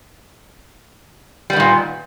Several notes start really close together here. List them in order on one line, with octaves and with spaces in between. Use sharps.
G3 B3 D#3 A#2